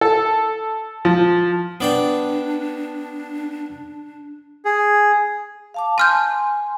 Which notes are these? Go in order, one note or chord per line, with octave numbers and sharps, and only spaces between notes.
A4
F3
B3 D4 D5 G5
G#4
F5 A5 D6
G#5 A5 C6 F6 G6